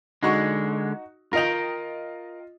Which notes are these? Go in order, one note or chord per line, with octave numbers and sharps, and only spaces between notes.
D3 G#3 D#4 F#4 C#6
F4 A#4 D#5 G5 F7